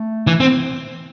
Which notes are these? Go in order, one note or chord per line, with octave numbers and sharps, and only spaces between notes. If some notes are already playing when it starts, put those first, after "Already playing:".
Already playing: A3
E3
C4